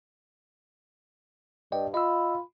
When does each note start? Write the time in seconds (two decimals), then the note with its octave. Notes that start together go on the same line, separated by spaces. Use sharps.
1.72 G2 D5 D#5 G5
1.94 F4 D#5 B5 E6